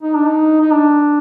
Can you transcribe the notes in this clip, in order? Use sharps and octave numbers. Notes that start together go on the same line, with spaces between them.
D#4
D4
D#4
D#4
D4